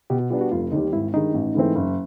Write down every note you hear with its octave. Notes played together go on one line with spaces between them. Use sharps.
B2 G4
F#4
G3 B3 D4 F4
F#4
F1 F4
D#2 D#3 G3 D#4
G#1 E4
G2 D#3 G#3 D#4
A1
G#2 E3 A3 C4
F#1